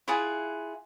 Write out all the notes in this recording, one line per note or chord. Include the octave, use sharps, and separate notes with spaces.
E4 F4 G#4 F#5